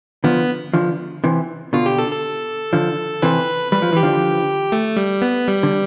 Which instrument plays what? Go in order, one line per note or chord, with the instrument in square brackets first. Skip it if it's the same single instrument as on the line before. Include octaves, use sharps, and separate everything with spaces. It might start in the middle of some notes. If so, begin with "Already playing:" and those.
[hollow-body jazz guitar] D3 F3 [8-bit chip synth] B3
[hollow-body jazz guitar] D3 F3
C3 E3
[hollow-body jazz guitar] B2 D3 [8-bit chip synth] F4
[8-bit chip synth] G4
A4
A4
[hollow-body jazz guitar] D3 F3
[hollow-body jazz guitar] C3 E3 [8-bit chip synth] B4
[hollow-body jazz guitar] G3 [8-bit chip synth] B4
[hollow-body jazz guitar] F3
[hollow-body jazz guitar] E3 [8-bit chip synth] G4
[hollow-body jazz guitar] D3 F3
[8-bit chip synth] A3
G3
B3
G3
[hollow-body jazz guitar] D3